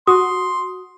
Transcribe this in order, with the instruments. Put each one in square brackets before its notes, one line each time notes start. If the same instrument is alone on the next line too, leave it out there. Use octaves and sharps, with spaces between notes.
[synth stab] F#4 [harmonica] C6 [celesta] D#6